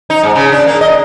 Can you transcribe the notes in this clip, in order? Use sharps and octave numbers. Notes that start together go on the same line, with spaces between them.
D#4
G#2
C#3
D4
A#3
D#5